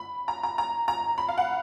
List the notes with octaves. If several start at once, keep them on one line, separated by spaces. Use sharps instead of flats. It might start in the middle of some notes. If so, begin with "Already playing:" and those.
Already playing: B5
A#5
A#5
A#5
A#5
B5
F5
F#5